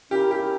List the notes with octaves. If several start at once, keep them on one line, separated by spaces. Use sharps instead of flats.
C#4 E4 G4 A#4
G4